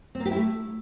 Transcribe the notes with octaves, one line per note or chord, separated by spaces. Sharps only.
C4
A#3
G4
E4
A3